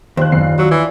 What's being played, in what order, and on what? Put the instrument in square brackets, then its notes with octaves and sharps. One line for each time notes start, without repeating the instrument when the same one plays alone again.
[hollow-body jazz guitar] D#2 [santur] F3 G3 F4 [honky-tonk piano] C5 F#6
[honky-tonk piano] F#1 C7
[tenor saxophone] F#3 [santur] D5 [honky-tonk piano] E6
[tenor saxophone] E3 [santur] D4